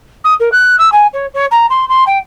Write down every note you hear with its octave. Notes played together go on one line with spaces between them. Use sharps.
D#6
A#4
F#6
E6
G#5
C#5
C#5
A#5
C6
C6
G5